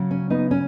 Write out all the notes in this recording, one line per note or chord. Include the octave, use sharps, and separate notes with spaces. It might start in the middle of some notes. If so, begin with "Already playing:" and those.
Already playing: C#3 F#3
C#4
B3 D#4
C#4